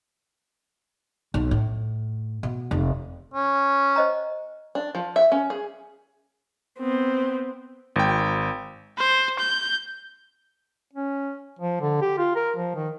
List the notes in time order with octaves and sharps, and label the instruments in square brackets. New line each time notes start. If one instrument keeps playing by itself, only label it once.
[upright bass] B1
A2
B2
F1
[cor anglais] C#4
[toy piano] C5 D#5 A#5
[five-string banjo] D4
F3
E5
C#4
G#4
[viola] B3 C4
[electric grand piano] G#1 G5
[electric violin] C5
G6
[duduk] C#4
F3
D3
G4
F4
A#4
F3
D#3